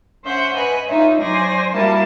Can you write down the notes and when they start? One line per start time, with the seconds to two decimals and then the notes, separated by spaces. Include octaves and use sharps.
0.24 C#4 C5 E5 F#5 G6
0.55 B4 D#5 G#5 B5 C#6
0.86 D#4 F4 C#5 E5
1.20 F#3 C5 D5 G#5 A#6
1.72 G3 A#3 E4 F#4 A5